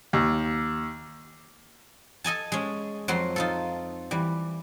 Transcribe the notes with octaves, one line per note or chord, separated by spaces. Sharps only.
D#2
A4 D#5 G#5 A5
G#3 C#4
F2 F#3 C6
D#4 F4 A4
E3 G3